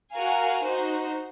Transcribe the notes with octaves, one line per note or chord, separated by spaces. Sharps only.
F#4 A#4 F5 G#5
D#4 F#4 C5